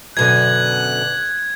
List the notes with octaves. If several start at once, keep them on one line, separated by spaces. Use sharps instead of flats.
F#2 B2 D3 F#6 G#6